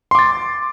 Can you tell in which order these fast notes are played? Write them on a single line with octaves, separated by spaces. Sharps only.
C6 D6 A6